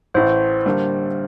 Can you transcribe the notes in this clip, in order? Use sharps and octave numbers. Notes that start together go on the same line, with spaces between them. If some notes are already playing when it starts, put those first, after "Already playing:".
A1 A2 E3 C5
D3 G3 A#3